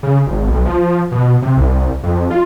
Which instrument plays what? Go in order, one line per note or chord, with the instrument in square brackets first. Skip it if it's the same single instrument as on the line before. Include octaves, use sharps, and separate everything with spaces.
[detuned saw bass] C#3
G#1
B1
F3
B2
C3
C2
F2
F4